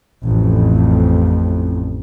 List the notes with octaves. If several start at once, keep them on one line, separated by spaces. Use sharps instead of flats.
A1 F2